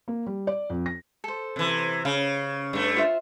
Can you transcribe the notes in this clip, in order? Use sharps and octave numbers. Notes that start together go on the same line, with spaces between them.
A#3
G3
D5
F2
A#6
A4 C5
C3 E3
C#3 F5
G2 A3
F4 C5 E5